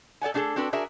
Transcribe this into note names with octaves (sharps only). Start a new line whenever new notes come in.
A4 D5 F#5 G#5
A3 D4 F#4 G#4 A4
C4 D4 F#4 A4 B4
D4 F#4 G#4 A#4 E5